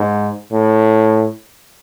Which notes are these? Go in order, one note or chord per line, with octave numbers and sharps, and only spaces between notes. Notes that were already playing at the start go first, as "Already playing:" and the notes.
Already playing: G#2
A2